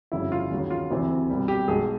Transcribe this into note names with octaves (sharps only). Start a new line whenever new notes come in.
G1 F2 C#3 F#3 E4
F4
D#2 C#3 F#3
F4
D2 C3 E3
C2 B2 G3
G4
B1 B2 G#3 G#4